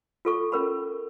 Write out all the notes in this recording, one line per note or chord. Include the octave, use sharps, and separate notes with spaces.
F4 A4 C#6
C#4 A#4 B5